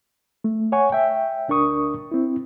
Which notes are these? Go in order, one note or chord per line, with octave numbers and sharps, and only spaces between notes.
A3
C#5 F#5 G#5 C#6
E5 G5
D2 D4 A#4 C#6 D#6
C4 E4